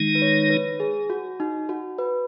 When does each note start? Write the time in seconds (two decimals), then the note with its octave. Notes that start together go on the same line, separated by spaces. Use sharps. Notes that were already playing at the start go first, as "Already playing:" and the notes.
Already playing: D#3 G#3 D#4
0.15 B4
0.22 C#5
0.50 B4
0.80 G#4
1.10 F#4
1.40 D#4
1.69 F#4
1.98 B4